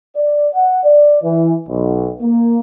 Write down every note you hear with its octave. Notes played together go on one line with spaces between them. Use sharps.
D5
F#5
D5
E3
B1
A#3